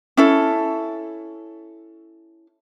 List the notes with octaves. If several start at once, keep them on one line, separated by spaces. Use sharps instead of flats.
C#4 E4 A4